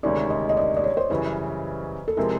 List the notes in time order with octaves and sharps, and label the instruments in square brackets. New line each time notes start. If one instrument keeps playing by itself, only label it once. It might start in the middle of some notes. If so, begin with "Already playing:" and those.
[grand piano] D2 C3 D#3 G#3 C#4 [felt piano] D5
[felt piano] D#5
D#5
D5
D5
C#5
C5
[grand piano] F#2 C#3 E3 G3 [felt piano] B4
[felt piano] A4
[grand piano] C3 F3 G#3 C4 E4 [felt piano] A#4